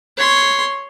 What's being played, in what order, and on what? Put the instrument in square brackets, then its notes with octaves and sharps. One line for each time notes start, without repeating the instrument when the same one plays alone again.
[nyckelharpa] C#5 C6